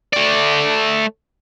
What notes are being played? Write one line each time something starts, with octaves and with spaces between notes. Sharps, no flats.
A3 D5